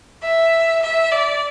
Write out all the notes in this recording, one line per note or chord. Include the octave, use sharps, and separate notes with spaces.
E5
E5
D5